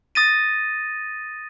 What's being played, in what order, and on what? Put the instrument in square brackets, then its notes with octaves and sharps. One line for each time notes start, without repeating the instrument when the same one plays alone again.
[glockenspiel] D#6 A6 A#6 D#7